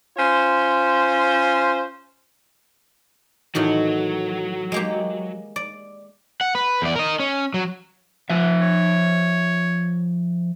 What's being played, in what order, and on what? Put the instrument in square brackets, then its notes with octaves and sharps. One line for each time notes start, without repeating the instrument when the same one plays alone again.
[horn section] C#4 F4 C5
[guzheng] A2 D#3 E3 [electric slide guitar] F#3 F#4
[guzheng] G#3 A#3 G4
D5
[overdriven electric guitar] F#5
B4
E2 D5
A#4 D#5
C#4
F#3
[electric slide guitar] F3 E5 [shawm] F#5
[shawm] C#5